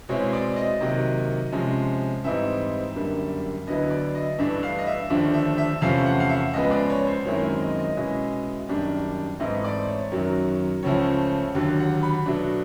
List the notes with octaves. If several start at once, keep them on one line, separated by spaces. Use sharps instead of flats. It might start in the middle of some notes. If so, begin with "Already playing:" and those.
B2 G#3 C4 E4 C#5
D5
D#5
C3 D#3 F#3 A#3
C3 F3 G#3 C#4
G#2 E3 G3 C4 D#4 E5
F#2 D3 G3 A#3
D2 D3 F#3 B3 E4 D#5
D5
D#5
G2 E3 A3 D4 E5
F5
D#5
E5
D#2 D3 F3 A3 D4
E5
E5
E2 C3 F3 A3 C#4 F5
F#5
F5
E5
C#2 C#3 F3 G#3 B3 D#5
D5
C#5
C5
F#2 D#3 G#3 C4 E4 C#5
D#5
D#5
B2 G#3 C#4 E4
F#2 D#3 G3 A#3 D4
G#2 E3 A3 C4 E4 D#5
D5
C#5
F#2 D#3 F#3
C#2 C#3 F3 A3 C#5
D#2 D3 F#3
F#5
B5
B2 F#3 A3 D4